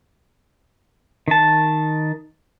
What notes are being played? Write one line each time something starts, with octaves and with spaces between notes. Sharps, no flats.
D#3 A5